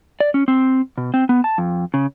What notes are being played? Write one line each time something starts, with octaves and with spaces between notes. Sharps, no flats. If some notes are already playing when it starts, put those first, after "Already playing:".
D5
C#4
C4
B2
C4
B3
A5
F2
C#3